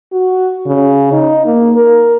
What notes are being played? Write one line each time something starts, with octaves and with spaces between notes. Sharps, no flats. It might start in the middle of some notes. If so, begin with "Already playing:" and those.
F#4
C#3
D#4
A#3
A#4